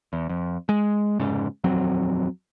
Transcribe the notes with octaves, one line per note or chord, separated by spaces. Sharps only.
E2
F2
G#3
F1 G#2 C#3
D#1 F2 F#3 C4